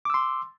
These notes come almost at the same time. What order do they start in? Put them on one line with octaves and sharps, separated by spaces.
D6 E6 C6